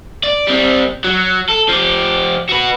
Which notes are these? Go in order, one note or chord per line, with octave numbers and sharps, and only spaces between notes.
D5
G3 C4
F#3
A4
F3 G4
F#4 B4